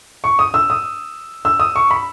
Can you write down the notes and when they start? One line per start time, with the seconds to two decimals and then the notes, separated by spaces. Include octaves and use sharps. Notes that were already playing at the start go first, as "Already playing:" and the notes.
0.24 C#6
0.39 D#6
0.54 E6
0.70 D#6
1.45 E6
1.60 D#6
1.76 C#6
1.91 B5